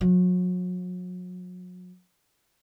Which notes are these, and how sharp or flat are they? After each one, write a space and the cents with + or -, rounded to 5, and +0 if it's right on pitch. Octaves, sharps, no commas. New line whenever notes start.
F#3 -35